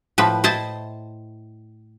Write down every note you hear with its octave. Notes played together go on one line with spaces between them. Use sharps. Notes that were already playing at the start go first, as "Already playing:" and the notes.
A2 F3 B4
E4 C5 D#5 A5